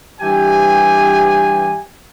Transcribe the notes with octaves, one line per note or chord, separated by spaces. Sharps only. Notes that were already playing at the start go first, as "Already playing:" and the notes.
G2 E3 G4 G5 G#5